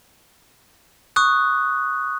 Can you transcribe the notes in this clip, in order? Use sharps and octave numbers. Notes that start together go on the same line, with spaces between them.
C#6 D#6 F#6